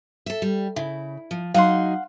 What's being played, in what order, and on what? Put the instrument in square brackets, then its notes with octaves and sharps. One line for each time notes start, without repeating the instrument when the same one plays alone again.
[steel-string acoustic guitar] A4 E5
G3
[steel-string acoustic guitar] C#3 [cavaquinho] E4
[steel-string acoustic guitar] F3
[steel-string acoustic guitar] F#3 D#4 G#4 [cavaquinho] F5 F#5 C6